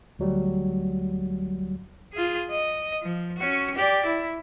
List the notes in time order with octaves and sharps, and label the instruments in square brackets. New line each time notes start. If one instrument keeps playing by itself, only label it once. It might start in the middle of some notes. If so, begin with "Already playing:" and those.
[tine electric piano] D2 F#3 G3
[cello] F4 G#4
D#5
F3
C#4 F#4
G4 D5
E4